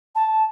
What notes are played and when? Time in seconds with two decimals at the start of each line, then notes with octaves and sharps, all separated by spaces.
0.15 A5